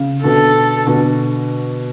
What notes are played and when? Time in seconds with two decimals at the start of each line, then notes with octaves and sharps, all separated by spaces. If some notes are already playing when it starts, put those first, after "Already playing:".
Already playing: C#3
0.23 B2 D3 A4
0.87 B2 D3